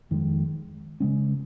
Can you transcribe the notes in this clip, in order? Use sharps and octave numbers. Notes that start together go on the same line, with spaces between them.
F2 D#3 G#3
C#3 G#3 C#4